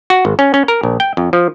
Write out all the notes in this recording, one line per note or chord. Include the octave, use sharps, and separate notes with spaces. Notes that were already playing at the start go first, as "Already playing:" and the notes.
F#4
G#1
C#4
C#4
A#4
A#1
G5
F2
F3